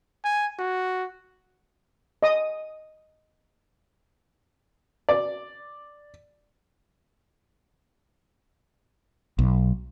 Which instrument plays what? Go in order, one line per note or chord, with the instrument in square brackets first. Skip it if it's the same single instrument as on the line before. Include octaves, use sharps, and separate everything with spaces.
[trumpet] G#5
F#4
[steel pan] D#5 D#6
[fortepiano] D5
[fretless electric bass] B1